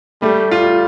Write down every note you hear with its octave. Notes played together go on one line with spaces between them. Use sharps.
G3 A3
G3 F4